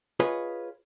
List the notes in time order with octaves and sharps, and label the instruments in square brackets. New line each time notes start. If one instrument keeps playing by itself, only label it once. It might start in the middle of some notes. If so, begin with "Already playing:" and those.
[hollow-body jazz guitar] F4 G#4 B4 C#5 D#5